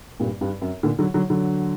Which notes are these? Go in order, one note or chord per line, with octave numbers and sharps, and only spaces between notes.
G2 A#2
G2
F#2
A#2 D3
D3 F#3
D3 F#3
D3 F#3